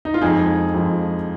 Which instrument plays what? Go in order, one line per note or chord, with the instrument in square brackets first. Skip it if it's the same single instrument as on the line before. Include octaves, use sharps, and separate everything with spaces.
[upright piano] D#4
F4
F2 F3 G#3 D#4 G#4
F2 F3 G#3